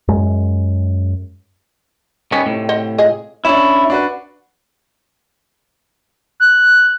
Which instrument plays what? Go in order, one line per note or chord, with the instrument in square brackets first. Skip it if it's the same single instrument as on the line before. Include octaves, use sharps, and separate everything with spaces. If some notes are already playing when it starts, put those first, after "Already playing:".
[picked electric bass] F#2 G#3
[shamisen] D#3 [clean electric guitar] G3 B3 C#4
[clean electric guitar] A2 C3
[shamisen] C5 D#5 F#5
F4 G#4 D#5
[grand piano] C#4 D4 [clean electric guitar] E4
[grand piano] D4 F#4 B4
[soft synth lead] F#6